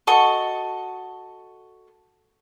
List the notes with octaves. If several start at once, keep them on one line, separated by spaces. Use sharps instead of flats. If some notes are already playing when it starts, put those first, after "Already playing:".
F#4 A4 D#5 C#6